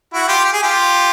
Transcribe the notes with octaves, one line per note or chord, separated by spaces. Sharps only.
E4 F#4
F4 G4
G4
G#4
F4 G4